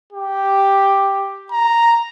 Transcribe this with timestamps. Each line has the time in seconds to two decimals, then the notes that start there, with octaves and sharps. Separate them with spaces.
0.13 G4
1.52 A#5